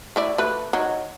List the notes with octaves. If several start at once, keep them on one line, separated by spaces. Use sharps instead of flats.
A3 E4 D5
A3 B4
D#3 F#3